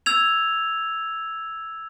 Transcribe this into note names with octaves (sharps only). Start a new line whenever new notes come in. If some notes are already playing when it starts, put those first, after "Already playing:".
E6 G#6 F7